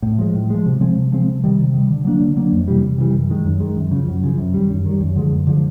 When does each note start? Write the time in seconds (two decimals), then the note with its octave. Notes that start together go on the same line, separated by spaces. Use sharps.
0.02 A2
0.19 F3 G#3
0.34 A2
0.50 F3 G#3
0.66 C3
0.81 F3 G#3 C4
0.96 C3
1.12 F3 G#3 C4
1.27 C3
1.44 D#3 G3
1.59 C3
1.74 D#3 G3
1.90 D3
2.05 F#3 A#3 D4
2.20 D3
2.37 F#3 A#3 D4
2.52 F2
2.68 C3 E3 G3
2.83 F2
2.98 C3 E3 G3
3.14 F#2
3.30 D#3 G#3
3.45 F#2
3.60 D#3 G#3
3.77 F#2
3.91 C#3
3.96 F3
4.07 F#2
4.24 C#3 F3
4.38 F#2
4.54 D#3 G3
4.70 F#2
4.85 D#3 G3
5.01 F#2
5.16 D3 F3 G#3
5.32 F#2
5.47 D3 F3 G#3